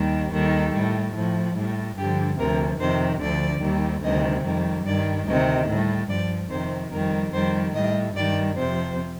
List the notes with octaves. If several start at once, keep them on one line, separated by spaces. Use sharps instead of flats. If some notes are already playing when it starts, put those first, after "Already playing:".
Already playing: D#2 D#3 G3
D#2 D#3 G3 A4
A2 G3
A2 F3
A2 G3
G2 D3 F3 G4
D2 C3 F3 A#4
F2 C3 D#3 C5
D2 D3 F3 D5
D#2 D#3 G3
D2 C3 D#3 G3 D#5
F2 D#3 G3
G2 D#3 G3 D5
D2 C3 D#3 D#5
A2 G3
G2 F3 D5
F2 C3 D#3 C5
F2 D#3 G3 A#4
F2 D#3 G3 C5
A2 G3 D#5
G2 D#3 G3 D5
F2 C3 F3 C5